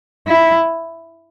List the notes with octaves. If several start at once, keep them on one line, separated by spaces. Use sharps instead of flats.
E4